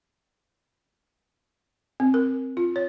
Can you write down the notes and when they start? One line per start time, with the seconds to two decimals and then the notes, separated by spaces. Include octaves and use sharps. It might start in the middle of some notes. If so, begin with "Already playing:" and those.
2.00 C4
2.14 A#4
2.57 F4
2.76 C#5